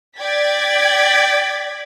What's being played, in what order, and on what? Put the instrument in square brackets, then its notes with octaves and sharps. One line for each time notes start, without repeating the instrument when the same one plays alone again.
[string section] D5 G5 G#6 A6 B6